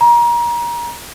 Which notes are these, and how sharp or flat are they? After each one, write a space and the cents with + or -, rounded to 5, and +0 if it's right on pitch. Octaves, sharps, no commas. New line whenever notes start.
A#5 +30